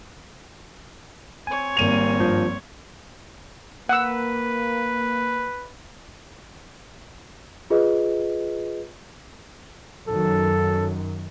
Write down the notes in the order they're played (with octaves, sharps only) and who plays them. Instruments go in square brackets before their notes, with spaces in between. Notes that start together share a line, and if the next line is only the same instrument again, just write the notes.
[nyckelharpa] C4 C#5 [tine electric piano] G#5
[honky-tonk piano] G#1 D#7 F7 [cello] G3 A#3
[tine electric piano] G2 F3 G6
[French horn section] A#3 [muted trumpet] B4 [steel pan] F#5 E6
[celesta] F4 G#4 B4 D#5
[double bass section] F#2 D#3 F#3 [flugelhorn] A4